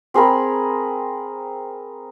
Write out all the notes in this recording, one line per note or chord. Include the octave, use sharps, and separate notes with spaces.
C4 G#4 A#4 B5